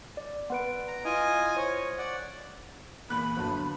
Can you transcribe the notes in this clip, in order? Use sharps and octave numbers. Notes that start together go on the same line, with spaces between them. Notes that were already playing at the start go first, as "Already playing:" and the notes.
D5
B3 B4 D7
A#5
E4 F4 D#5 G#5
C5 C#5
D5 F#5
E2 A#2 B5 F#6
G1 F#3 A5